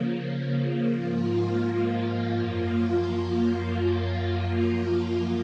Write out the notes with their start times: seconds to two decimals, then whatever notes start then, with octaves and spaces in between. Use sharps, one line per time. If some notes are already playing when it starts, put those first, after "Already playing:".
Already playing: C#3 F3 A#3
0.93 G#2 F3 A#3 F4
2.37 F#2 F3 A#3 F4